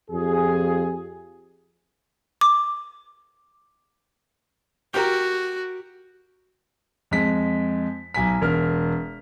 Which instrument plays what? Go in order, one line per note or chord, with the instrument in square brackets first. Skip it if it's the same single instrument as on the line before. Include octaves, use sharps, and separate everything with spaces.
[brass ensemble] F2 F4 G4 G#4
[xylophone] D6
[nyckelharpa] F#4 [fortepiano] G4 A#4
[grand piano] F2 G#3 B6
B1 G#5 B6
E1 A#4 F6